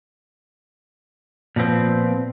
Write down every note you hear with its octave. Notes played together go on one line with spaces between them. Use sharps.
A#2 F3 B3 C4